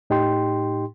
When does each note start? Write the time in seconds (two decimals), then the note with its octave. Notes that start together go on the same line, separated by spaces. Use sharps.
0.10 A2 D#4 G4 G5 C6